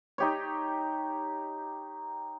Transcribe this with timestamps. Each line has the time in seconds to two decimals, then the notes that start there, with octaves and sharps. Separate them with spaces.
0.18 D#4 G4 C#5